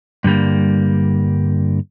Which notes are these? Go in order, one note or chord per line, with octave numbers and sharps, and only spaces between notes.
G2 D3 G3 A#3